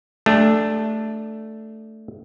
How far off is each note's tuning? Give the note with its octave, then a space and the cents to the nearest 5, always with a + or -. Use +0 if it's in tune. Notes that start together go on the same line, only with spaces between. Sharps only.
A3 +0 D4 +0 G4 +45